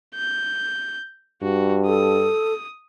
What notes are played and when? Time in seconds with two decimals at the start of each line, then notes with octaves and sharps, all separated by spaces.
0.15 G6
1.43 G2 F#4
1.87 A4 D#6